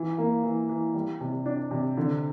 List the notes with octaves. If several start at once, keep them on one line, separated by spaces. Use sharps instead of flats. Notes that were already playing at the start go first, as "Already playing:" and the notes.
Already playing: E3
A#3
E3
E3
G3
C3
D4
C3
D3